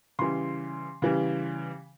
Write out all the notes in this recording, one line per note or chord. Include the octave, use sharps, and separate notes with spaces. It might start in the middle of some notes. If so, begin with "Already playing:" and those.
C#3 E3 G3 C6
C#3 E3 G3